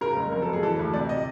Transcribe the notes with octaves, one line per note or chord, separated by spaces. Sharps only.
C#3 A#4
F#1
F2 A#4
A4
F#1
G#4
E3 A4
D2
C3 D5
D#5